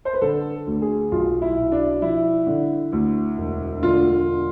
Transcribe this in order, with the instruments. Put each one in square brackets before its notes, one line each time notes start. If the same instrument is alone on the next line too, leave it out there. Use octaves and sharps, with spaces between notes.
[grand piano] C5
B4
D3 A4
D2
G#4
B1 F4
E4
B2
D4
F3 E4
D3
D2
E1
D3 F4